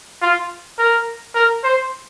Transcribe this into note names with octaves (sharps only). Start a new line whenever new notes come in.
F4
A#4
A#4
C5